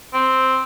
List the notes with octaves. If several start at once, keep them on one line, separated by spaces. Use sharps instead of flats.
C4